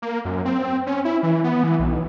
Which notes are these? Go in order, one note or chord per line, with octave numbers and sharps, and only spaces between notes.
A#3
F#2
C4
C#4
E4
E3
B3
E3
B1